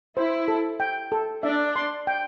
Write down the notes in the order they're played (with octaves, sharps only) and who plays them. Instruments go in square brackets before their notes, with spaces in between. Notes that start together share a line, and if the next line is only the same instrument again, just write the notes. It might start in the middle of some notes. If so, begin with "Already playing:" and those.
[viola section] E4 [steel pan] C5
[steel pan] A4
G5
A4
[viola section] D4 [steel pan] E5
[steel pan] C6
G5